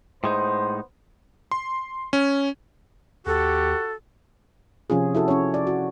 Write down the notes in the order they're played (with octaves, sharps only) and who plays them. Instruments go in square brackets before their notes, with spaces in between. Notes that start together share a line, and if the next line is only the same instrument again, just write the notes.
[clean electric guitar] A2 G#3 D#4 [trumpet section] B3 C5
[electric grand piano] C6
C#4
[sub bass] D#2 [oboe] F#4 [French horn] G4 [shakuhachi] A4
[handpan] C3 F3 C#4 F4 G#4
E4 F#4 A4
C#4 C#5
D5
F#4